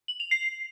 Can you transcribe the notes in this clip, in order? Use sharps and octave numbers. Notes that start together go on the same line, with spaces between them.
F#7
F7
C7